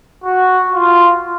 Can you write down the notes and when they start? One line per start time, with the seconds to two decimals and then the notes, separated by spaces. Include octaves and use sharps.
0.24 F#4
0.72 F4